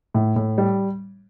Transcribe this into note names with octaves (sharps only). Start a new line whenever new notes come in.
A2
A2
G3